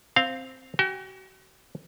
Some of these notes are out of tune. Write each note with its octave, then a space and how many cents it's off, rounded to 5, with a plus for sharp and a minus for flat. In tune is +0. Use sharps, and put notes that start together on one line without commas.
C4 +0 F5 +0
F#4 +40 G5 +45